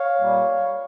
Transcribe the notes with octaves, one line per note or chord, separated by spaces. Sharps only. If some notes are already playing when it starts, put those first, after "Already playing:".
Already playing: C#5 F5
A#2 G3 A#3